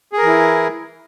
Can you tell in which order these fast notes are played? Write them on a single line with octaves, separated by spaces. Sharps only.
G#4 A#4 E3 E4